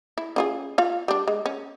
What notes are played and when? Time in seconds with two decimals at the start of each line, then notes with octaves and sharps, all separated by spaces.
0.18 E4
0.36 C#4 F4 G#4
0.78 F4 F5
1.08 G3 D4
1.28 G#3
1.46 C#4